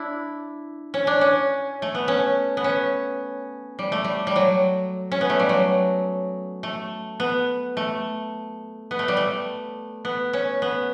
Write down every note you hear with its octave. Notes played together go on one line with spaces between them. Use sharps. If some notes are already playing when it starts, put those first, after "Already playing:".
Already playing: D4 E4
C#4
D4
C#4
A3
B3
C#4
B3
C#4
G3
A3
G3
G3
F#3
C#4
B3
A3
G3
F#3
A3
B3
A3
B3
A3
G3
A3
B3
C#4
B3